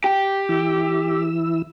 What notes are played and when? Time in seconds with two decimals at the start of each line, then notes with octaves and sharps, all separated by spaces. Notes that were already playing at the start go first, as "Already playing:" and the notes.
0.04 G4
0.49 E3 E4 E6